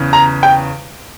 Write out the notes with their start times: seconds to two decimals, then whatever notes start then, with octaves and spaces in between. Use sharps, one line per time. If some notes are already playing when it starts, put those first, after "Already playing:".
Already playing: E2 C#3
0.13 A#5
0.43 G5